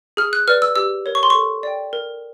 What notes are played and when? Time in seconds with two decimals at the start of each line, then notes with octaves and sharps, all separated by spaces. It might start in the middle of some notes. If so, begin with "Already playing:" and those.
0.17 G#4 F6
0.33 F#6
0.48 B4 D5 F6
0.62 E6
0.76 G4 E6
1.06 A#4 C#5
1.15 C#6
1.23 C6
1.30 A4 C#6
1.63 D5 G5
1.93 A#4